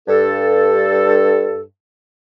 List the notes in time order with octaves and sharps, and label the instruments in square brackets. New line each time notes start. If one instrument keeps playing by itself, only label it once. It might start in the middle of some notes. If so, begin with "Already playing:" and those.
[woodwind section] G2 A4